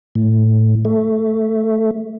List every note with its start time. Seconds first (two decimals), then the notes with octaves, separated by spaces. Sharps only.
0.15 A2
0.85 A3